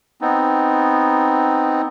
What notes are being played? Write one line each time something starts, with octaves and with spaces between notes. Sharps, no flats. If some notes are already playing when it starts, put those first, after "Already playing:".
B3 C4 D#4